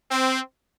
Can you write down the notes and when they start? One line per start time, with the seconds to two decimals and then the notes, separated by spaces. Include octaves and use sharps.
0.11 C4